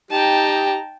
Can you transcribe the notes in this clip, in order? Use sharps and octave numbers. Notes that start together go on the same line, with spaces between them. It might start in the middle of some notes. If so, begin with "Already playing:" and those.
D#4 G4 G5 A5 A#5